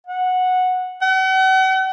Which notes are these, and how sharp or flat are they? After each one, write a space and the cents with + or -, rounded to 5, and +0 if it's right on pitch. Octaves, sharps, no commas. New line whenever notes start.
F#5 -10
F#5 +40